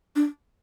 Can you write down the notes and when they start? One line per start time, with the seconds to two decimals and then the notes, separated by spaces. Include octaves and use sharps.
0.16 D4